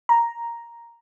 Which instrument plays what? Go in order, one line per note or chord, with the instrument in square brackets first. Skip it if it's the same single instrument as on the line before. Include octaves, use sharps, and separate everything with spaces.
[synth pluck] A#5